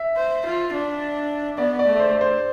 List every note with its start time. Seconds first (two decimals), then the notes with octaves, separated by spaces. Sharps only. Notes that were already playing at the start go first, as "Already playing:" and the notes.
Already playing: E5
0.17 C5
0.45 F4
0.73 D4
1.57 B3 D5
1.79 D5
1.86 A3
2.00 C5
2.21 C5